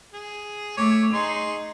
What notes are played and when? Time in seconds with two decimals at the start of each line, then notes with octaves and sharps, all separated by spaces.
0.14 G#4
0.77 A3 C#5 D6
1.13 D#4 G#4 C6